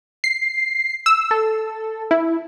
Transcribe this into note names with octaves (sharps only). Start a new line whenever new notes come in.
C7
E6
A4
E4